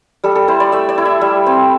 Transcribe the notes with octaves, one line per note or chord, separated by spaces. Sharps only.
G3 A4
A4
E4 C5
D5
A3 E5
D5
E4
E5
G3
C4